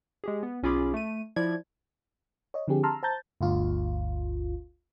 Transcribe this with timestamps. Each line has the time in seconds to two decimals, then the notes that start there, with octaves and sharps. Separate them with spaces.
0.24 G#3 G4 G#4
0.43 B3
0.63 B1 C#4 F4 G#4 B5 D6
0.94 A3 D#7
1.36 F3 E4 D5 G#6
2.54 C#5 D#5
2.68 D3 F3 C4 D4 G4 G#4
2.83 A5 A#5 C6 E6 F6
3.03 C5 A5 A#5 G6 A6
3.41 G1 D2 F4